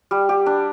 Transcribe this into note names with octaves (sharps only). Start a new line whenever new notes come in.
G3
G4
D4